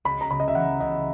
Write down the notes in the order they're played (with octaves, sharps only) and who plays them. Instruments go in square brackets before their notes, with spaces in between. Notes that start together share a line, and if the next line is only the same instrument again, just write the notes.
[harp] C#2 [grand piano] B5
[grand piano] A#5
[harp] C#3 [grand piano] B5
[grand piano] D#5
E5
[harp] E3 [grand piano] F#5
[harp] C#2 [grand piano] D#5